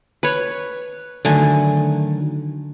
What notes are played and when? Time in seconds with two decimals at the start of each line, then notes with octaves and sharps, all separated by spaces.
0.23 B4 C#5
1.25 D3 D#3 F#3 A3 G#5